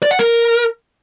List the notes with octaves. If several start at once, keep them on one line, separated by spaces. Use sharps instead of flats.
D5
F#5
A#4